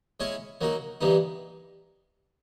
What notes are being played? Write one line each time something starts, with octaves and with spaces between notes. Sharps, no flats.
G#3 C#4 E4 G#4 C#5
F#3 A#3 D#4 F#4
G2 E3 G3 B3 D#4